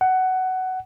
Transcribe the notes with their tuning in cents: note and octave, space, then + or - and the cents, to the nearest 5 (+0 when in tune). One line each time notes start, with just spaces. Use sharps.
F#5 +15